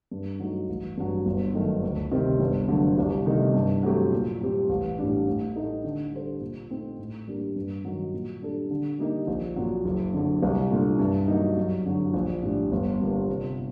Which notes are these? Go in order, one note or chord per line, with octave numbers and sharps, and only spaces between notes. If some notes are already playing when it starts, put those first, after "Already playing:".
G2
F#3 A3 D#4
A1
G2 F#3
G1
F#2 D#3 A3
D2
C3 D#3 G3 C4
G1
F#2 D3 A3
C2
C3 D#3 A3 D#4
G2
F#3 A3 C4 G4
A#2
G3 C4 G4
A1
A2 G3 D4
A2
A3 D#4
D3
G3 D4 A4 C5
A#2
A3 C4 D#4
A2
G3 A#3 D4
G2
D#3 F#3
A#2
G3 D4 A4
D3
G3 A#3 D#4 G4
A#1
A#2 F#3
F#1
F#2 D3
C2
A#2 A3 D4
G2
F#3 A#3 D#4
F#2
D3 F#3
A#1
A2 G3 D4
G1
G2 D3 G3 A#3
C3